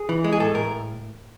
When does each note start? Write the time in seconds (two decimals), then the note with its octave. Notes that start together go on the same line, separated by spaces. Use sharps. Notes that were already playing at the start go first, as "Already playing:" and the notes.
Already playing: G#4
0.09 E3
0.24 G#3
0.32 G#4
0.40 A2 A4
0.55 A2 A#4